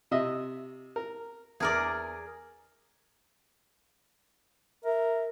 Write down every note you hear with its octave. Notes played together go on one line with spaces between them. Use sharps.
C3 D#5 E5
A#4
E2 G#4 A#4 D5
A#4 E5